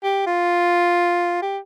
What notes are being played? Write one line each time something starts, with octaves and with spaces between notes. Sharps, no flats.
G4
F4
G4